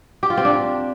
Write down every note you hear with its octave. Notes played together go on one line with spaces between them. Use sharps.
G4
F4
C4
D4